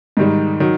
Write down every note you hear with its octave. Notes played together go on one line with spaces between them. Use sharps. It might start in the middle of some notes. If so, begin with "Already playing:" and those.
G#2 D#3 G3
D#3 F#3